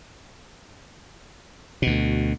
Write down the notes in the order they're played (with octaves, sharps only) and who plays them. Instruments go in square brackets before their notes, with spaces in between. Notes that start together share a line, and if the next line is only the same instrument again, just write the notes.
[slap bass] D2 B2